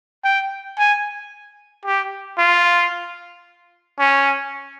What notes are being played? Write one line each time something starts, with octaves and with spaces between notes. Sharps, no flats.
G5
G#5
G4
F4
C#4